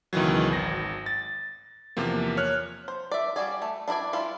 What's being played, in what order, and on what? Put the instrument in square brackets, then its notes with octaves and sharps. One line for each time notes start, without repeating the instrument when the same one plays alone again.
[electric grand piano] C#2 B2 D#3 E3 F#3
G#1 A#6
A6
E2 C3 F3 A#3
C#5 F6 F#6
[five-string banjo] C5
D5 E5
G3 F#4 G#4 D5 G#5
A3
D4 E4 A#4 D5 G#5
G3 E4 F4